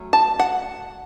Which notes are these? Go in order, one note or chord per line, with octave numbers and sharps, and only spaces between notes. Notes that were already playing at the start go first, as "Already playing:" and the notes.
Already playing: F#3 A3 C#4
A5
F#5